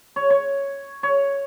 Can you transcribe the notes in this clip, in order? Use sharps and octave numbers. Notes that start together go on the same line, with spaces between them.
C#5
C#5
C#5